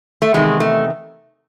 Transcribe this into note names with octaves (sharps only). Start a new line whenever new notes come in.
A3
E2 C3 D#3 G#3
A3